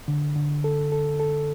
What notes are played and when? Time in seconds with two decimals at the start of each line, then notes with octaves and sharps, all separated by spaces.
0.08 D3
0.36 D3
0.64 A4
0.92 A4
1.20 A4